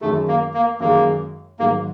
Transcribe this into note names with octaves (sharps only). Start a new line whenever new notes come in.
F#2 D#3 G#3 A3
A#3
A#3
F#2 D#3 G#3 A#3
G#2 D#3 F#3 A#3